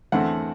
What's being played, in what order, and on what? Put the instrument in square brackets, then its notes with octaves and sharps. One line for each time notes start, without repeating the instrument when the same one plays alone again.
[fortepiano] E2 D3 A3 C4 F#5